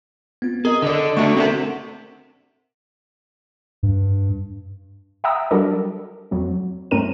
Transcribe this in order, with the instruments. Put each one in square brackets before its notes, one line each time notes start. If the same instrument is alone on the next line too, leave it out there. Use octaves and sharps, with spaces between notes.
[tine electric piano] B3 C4 F4
[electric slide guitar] G#4 [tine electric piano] A#4 D#5
[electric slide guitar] D3 A4 [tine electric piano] D5 D#5
[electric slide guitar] A3 D4 F#4 [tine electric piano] D5 E5 C#6
[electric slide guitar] C4 D#5 E5 [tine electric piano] A4 A#4 F#5
[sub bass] G2
[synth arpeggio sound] E5 F#5 G5 A#5 D#6 E6
F#3 G3 D4 A4 A#4 D5
F2 F#3 C4
G2 A3 C4 C#4 A#4 D#7